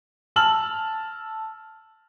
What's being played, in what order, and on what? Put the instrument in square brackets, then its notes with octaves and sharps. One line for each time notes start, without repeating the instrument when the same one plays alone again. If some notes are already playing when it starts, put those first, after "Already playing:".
[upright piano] A5 E6 F6 F#7